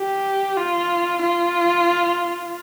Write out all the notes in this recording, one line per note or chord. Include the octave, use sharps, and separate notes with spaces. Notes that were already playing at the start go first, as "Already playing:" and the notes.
Already playing: G4
F4
F4